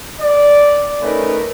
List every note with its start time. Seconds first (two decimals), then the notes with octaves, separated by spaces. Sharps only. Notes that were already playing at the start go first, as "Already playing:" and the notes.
0.21 D5
1.01 A3 C#4 D#4 A#4 B4